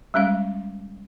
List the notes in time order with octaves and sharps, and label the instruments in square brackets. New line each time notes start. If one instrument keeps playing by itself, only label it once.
[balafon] G3 G#3 C#4 F5